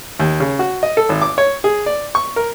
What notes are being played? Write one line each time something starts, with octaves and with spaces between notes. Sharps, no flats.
D#2
C#3
F#4
D#5
A4
G#1
D6
C#5
G#4
D5
C#6
A#4